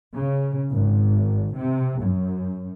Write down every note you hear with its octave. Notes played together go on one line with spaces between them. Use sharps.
C#3
G#1
C3
F#2